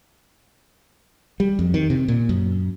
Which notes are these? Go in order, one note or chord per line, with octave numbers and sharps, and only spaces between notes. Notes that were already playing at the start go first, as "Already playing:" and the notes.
G3
F2
D#3
C3
A#2
F#2